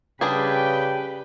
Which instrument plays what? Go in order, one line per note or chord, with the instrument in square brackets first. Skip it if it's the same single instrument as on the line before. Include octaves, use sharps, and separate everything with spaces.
[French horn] C#3 [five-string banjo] G3 D4 G#4 [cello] G4 B4 [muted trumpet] G5